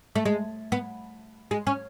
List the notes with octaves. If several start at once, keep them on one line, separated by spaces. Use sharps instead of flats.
A3
G#3
B3
G#3
C#4